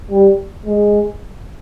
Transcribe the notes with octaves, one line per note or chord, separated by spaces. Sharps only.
G3
G#3